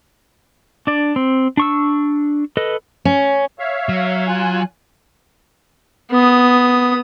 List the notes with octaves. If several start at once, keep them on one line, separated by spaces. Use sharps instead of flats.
D4 D5
C4
D4 C#6 E6
A4 B4 D#5
C#4
C#5 E5 F5
F#3
F4 G#5 F#6
B3 D#6